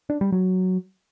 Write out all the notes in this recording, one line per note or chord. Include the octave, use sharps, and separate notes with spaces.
D4
G3
F#3